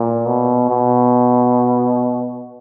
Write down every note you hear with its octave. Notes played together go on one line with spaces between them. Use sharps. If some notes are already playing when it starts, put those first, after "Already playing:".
Already playing: A#2
B2
B2